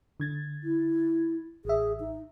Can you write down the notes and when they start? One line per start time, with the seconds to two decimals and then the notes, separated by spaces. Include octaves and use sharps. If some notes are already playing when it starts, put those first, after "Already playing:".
0.20 D3 G#6 A6
0.63 E4
1.65 A1 G#4 E5
2.00 D#4